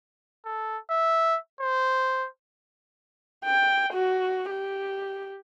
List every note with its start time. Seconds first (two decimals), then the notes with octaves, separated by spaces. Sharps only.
0.45 A4
0.91 E5
1.61 C5
3.45 G5
3.93 F#4
4.50 G4